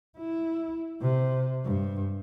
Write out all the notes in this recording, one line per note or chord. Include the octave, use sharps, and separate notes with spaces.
E4
C3
G2